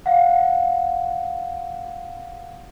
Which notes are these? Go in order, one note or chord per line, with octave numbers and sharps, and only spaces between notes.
F5 F#5